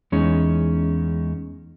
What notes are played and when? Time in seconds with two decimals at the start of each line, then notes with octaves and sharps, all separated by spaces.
0.12 E2 G#3 C#4 D#4